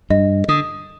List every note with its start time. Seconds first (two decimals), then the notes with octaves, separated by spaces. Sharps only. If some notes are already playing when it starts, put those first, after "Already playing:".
0.10 G2 D#5
0.48 D3 D#6